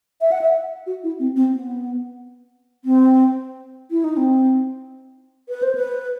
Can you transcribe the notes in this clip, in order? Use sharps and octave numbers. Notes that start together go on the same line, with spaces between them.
E5
F#5
E5
F#4
E4
C4
C4
B3
C4
E4
D#4
C4
B4
C5
B4